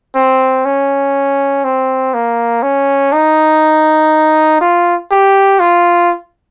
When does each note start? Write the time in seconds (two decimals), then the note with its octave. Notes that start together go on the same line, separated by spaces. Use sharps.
0.16 C4
0.65 C#4
1.64 C4
2.14 A#3
2.63 C#4
3.13 D#4
4.61 F4
5.11 G4
5.60 F4